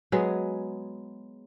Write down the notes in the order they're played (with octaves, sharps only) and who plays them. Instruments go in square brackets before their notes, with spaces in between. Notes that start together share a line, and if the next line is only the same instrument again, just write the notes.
[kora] F#3 G#3 B3 G#4